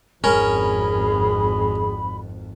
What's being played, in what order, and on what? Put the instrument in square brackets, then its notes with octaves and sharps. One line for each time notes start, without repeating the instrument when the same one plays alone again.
[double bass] G#1 F2 [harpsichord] C#4 A#4 C#5 [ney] G#4 [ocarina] B5